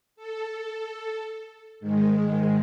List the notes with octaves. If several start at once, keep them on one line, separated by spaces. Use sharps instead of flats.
A4
G#2 D#3 G#3